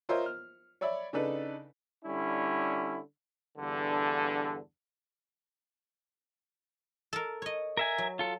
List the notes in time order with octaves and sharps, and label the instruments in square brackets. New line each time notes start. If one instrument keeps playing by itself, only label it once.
[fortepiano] F4 A#4 C5 C#5 D#5 E5
F6
C#5 D5 E5 B5
C#3 D4 D#4 A4 B4
[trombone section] D3 G3 C#4 E4
E2 G2 D3
[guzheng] A4 A#4
C#5 D#5
[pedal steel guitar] A#4 E5 G#5
[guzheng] F#3
[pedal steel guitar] F4 A4